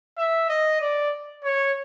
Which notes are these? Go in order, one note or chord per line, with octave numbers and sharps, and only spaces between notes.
E5
D#5
D5
C#5